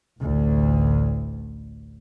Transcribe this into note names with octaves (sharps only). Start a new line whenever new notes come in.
A1 D2